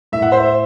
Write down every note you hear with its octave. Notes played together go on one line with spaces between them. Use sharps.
A2 E5
F#5
C5 E5